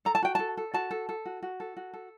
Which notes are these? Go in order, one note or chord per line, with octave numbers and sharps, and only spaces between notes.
A4 A#5
A5
F#4 G5
A4 A5
A4
F#4 A5
A4
A4
F#4
F#4
A4
F#4
A4